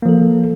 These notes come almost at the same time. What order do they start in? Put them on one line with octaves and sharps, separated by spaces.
A#3 F3 A4